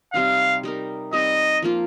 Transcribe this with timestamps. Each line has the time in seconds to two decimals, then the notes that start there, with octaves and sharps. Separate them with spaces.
0.13 C3 G3 C4 D#4 F5
0.63 G3 D#4 A#4
1.13 G3 C4 D#4 D#5
1.62 F3 A#3 F4